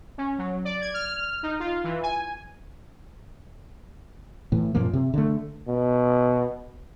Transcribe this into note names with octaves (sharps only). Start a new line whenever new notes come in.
C#4
F#3
D5
G#6
F6
D#4
F4
E3
G#5
A2 E3
F#2 A#2 F3 A#3
C3
D3 A3
B2